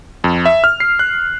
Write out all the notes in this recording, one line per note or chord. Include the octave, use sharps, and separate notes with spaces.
F2
E5
F6
C7
F#6